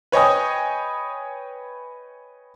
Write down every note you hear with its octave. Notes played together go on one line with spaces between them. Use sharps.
B4 C#5 D#5 G5 G#5 D#6